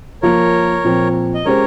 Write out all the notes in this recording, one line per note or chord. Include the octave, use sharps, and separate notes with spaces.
F3 A#3 F4 A#4 C#5
A#2 F3 C4
D#5
G#3 C#4 G4 A#4 C5 C#5